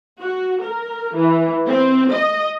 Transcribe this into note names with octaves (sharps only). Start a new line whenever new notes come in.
F#4
A#4
E3
C4
D#5